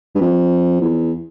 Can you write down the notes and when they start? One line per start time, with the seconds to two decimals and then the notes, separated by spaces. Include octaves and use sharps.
0.15 G2
0.21 F2
0.81 E2